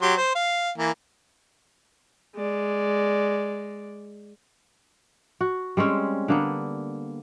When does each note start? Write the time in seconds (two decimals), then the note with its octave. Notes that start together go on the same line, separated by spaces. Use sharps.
0.02 F#3 G4 C6
0.17 C5
0.35 F5
0.78 E3 A#3
2.36 G#3 D5
5.41 F#4
5.77 G3 G#3 C4 C#4
6.28 D3 A#3 B3